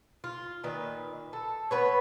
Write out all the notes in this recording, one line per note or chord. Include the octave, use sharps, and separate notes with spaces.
F4
A#2 D#3 B4
A4
B3 B4 C#5